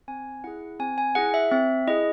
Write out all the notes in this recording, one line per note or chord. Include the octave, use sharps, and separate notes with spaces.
C4 G#5
E4 G#4 F#5
C4 G#5
G#5
E4 G#4 F#5
E5
C4 E5
E4 G#4 D#5